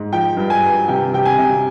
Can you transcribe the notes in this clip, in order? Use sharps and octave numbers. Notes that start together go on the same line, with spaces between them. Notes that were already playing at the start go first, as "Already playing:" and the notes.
Already playing: G#2
F3 G5
G2
G#5
G2
C3 G5
C3 G5
G#5
C3